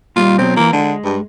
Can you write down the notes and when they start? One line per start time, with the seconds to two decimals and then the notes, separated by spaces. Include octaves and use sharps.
0.16 A#2 F#3 G3 F4
0.38 B2 F#3 C4
0.57 E3 F3 A#3
0.73 D3 G#3
1.05 G2